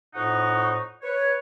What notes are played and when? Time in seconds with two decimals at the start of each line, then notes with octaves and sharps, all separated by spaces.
0.15 F2 A2 D#4 F#5 C#6
1.03 B4 C#5